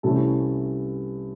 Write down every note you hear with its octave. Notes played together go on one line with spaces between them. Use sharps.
C2 C3 E3 A3 C#4 A4